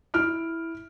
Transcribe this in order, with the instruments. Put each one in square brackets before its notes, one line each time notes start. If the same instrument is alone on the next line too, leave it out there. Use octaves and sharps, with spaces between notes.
[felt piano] E4 F6 D7